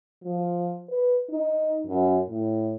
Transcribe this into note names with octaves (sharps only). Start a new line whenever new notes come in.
F3
B4
D#4
F#2
A2